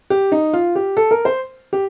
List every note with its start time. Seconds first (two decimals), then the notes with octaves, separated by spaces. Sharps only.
0.10 G4
0.32 D#4
0.53 F4
0.76 G4
0.97 A4
1.11 A#4
1.25 C5
1.73 G4